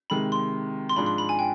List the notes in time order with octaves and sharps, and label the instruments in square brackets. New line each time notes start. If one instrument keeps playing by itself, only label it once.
[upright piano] C3 D#3 G#3 [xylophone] B5
[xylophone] C6
C6
[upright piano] G#2 F3 G#3 D4 [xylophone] B5
[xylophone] C6
B5
G#5
G5